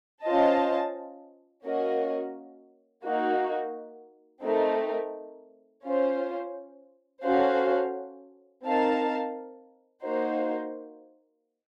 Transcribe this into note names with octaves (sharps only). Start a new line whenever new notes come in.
C#4 F4 C5 D#5 A5
A#3 C#4 F#4 A#4 D#5
A#3 D#4 F#4
A3 C4 D#4 A#4
C#4 F4 C5
C#4 F#4 A4 C5 F5
C4 D#4 A#4 F5 A5
A#3 D#4 F#4 C5